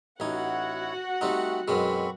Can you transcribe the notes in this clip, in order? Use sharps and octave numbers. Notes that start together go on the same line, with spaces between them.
A1 D#4 E4 F#4 C#5 F#5
G3 A3 C4 D#4
F#2 B2 G#3 C4 B5 C#6